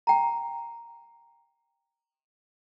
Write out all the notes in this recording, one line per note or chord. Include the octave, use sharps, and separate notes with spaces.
G5 A#5